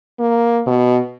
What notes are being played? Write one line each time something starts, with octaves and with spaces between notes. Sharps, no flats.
A#3
B2